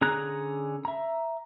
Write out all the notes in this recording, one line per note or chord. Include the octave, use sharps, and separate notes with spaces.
D3 C#4 G#4 A#5 F#6
E5 A#5